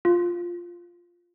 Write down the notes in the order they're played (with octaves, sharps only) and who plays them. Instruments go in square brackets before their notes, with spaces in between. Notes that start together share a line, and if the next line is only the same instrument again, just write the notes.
[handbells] F4